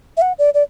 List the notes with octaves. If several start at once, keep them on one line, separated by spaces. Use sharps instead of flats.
E5
F#5
D5
D5